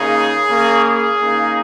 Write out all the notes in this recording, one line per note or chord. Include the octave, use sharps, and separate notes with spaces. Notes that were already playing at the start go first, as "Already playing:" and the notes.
Already playing: C#3 A#3 D#4 G#4
C#3 A#3 C#4
G#4
C#3 A#3 D#4